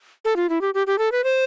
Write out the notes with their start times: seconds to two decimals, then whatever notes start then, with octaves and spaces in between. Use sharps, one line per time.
0.25 A4
0.36 F4
0.49 E4
0.61 G4
0.74 G4
0.87 G4
0.98 A4
1.12 B4
1.24 C5